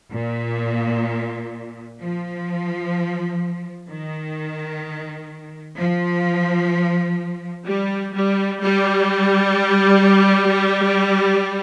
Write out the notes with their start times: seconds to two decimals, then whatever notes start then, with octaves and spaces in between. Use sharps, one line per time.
0.11 A#2
1.99 F3
3.89 D#3
5.78 F3
7.67 G3
8.14 G3
8.62 G3